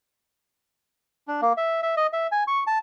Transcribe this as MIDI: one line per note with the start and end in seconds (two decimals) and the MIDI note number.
1.28 1.41 62
1.41 1.53 58
1.57 1.81 76
1.83 1.95 76
1.97 2.07 75
2.13 2.27 76
2.32 2.44 80
2.47 2.63 85
2.67 2.78 81